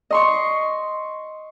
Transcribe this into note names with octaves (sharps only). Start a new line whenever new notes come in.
D#5 C6 C#6